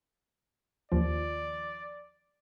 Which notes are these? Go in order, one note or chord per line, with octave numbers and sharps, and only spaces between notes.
D#2 F3 D5